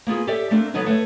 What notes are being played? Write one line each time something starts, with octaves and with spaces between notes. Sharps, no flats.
A#3 B3 F4 G#4
G4 A4 C#5 D5 E5
A3 A#3 C4 D4
D3 F#3 B3 D#4 F#4 B4
A3 B4 C#5